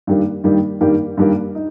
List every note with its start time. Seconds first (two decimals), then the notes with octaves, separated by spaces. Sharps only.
0.07 G2 D#3 G3 A#3
0.44 G2 D#3 G3 A#3
0.81 G2 D#3 G3 A#3
1.17 G2 D#3 G3 A#3
1.55 D#4